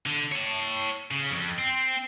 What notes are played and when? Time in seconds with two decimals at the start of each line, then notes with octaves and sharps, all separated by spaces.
0.06 D3
0.32 C#5 A5
1.11 C#3
1.31 F2
1.59 C4